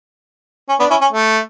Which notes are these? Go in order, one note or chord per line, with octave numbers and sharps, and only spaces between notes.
C#4
B3 D4
C#4 E4
C#4
A3